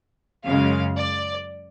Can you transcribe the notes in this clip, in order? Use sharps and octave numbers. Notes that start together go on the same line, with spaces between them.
F#2 C#3 G#3 F5
D5